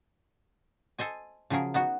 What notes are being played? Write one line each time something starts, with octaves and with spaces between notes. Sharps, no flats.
A4 C5 D#5 G#5
C#3 F3 F#3 G#4 A#4
B3 D#4 F#4